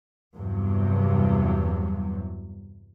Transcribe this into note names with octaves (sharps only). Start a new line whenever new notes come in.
E2 G2 C3 F#3